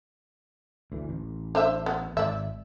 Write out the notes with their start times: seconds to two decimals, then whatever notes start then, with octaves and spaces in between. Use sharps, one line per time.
0.92 D2 E3
1.09 A1
1.55 D4 C5 E5
1.86 B3
2.17 G#1 D5 E5